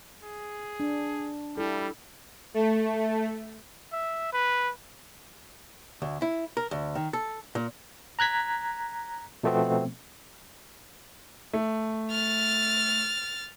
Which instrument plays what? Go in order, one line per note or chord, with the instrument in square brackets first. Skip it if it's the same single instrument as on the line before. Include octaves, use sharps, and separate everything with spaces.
[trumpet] G#4
[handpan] D4
[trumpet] G3 [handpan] E4 A4
[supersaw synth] A3
[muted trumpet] E5
B4
[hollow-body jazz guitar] D2
E4
A#4
D2
D#3
A4
A#2
[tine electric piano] A#5 F#6 G#6 B6
B2 F3 A3 B3 C4
[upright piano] A3
[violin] F6 A6